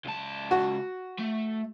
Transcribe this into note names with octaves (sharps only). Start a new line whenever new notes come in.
C#2 A5
F#4
A3